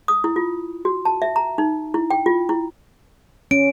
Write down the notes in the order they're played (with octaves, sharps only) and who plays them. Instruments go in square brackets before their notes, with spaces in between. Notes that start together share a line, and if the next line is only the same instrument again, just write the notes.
[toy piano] D#6
E4
F4
F#4
A5
E5
A#5
D#4
E4
G5
F4
E4
[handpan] C#4 [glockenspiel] D7